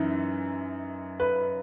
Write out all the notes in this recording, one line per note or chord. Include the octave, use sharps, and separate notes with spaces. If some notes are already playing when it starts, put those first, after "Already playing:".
Already playing: F#2 E3 D#4
B4 B5